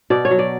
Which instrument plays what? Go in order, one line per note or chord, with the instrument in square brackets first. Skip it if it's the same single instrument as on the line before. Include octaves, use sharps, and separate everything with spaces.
[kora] B2 D5
C#5
F#3
D5